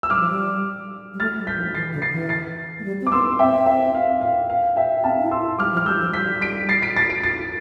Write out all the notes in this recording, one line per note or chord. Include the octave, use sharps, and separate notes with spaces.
E6
G3 D6 F6
F3
G3
G3
A3 F6 A6
G3
G6 B6
F3
E3 A6 C7
D3
A6 C7
E3
A6 C7
A3
G3
C4
D6
B3 C6 E6
C4 E5 G5
E5
F5
F5
F5
E5 G5
C4 F5 A5
D4
E4
C6 E6
E4
G3 D6 F6
F3
F6
G3 E6 G6
F3
G3 G6 B6
B6 D7
A6 C7
B6 D7
A6 C7
B6 D7
A6 C7